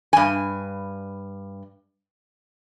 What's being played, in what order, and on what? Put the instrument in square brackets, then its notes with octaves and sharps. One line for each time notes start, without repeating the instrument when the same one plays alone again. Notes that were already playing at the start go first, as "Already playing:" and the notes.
[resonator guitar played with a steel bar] G2 G#5